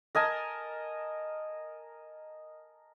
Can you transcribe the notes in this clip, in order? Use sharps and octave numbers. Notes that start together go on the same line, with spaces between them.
A#4 D#5 G#5 A5